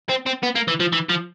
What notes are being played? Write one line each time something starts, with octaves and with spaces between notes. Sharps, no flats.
C4
C4
B3
A#3
E3
F3
E3
F3